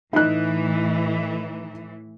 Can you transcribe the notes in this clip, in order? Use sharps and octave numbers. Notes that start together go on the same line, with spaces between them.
A2 E3 D#4 F#6